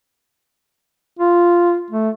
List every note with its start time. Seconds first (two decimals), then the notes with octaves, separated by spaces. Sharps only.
1.19 F4
1.91 A3